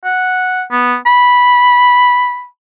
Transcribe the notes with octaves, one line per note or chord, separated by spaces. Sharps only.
F#5
B3
B5